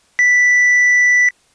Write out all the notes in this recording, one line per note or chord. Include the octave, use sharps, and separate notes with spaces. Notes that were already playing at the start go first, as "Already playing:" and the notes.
B6